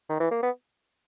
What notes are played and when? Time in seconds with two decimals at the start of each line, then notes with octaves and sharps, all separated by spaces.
0.09 D#3
0.20 E3
0.31 A#3
0.42 B3